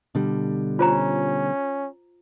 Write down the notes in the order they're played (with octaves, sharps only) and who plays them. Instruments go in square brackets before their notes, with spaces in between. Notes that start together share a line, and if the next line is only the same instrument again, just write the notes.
[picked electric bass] B2 D3 G3
[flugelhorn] C#4 [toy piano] F4 C5 A#5